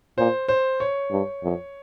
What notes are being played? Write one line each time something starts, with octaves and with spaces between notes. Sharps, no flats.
A#2 C5
C5
C#5
G2
F2